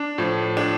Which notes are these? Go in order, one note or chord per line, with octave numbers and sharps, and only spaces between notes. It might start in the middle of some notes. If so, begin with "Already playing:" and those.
Already playing: D4
A2 F3
D4